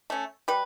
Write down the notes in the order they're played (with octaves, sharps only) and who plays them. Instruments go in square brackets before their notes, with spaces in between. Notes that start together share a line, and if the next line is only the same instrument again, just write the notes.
[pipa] A3 C#4
G3 B4